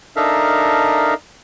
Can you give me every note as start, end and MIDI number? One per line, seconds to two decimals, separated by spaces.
0.16 1.14 62
0.16 1.14 63
0.16 1.14 69
0.16 1.14 70
0.16 1.14 76
0.16 1.14 77